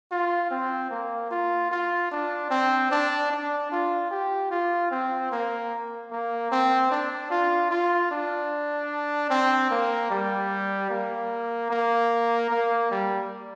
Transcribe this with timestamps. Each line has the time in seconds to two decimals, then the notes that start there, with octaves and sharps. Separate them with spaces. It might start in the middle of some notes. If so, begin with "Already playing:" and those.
0.12 F4
0.51 C4
0.91 A#3
1.31 F4
1.71 F4
2.11 D4
2.50 C4
2.91 D4
3.31 D4
3.72 F4
4.11 G4
4.51 F4
4.91 C4
5.31 A#3
6.11 A#3
6.51 C4
6.91 D4
7.30 F4
7.70 F4
8.11 D4
9.30 C4
9.70 A#3
10.10 G3
10.90 A#3
11.70 A#3
12.50 A#3
12.91 G3